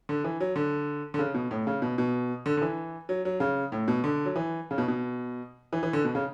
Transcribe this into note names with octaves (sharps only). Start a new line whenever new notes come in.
D3
E3
F#3
D3
D3
C#3
B2
A2
C#3
B2
B2
D3
D3
E3
F#3
F#3
C#3
A2
B2
D3
F#3
E3
C#3
B2
B2
E3
E3
D3
B2
C#3